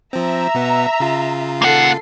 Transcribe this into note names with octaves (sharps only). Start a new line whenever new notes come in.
F3 C4 E5 A#5
B2 B3
C#3 F4
A#3 A4 F#5 C7